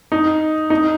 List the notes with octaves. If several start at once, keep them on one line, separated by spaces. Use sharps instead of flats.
D#4
D#4